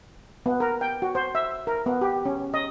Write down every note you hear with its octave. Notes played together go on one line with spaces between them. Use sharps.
B3
A#4
G5
F#4
C5
E5
A#4
B3
G4
C#4
D#5